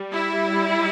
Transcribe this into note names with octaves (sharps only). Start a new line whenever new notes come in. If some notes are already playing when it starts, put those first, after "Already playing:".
Already playing: G3
E4